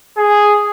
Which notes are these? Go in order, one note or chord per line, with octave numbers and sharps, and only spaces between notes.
G#4